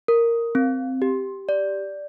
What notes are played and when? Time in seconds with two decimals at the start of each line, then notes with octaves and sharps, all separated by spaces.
0.08 A#4
0.55 C4
1.02 G4
1.49 D5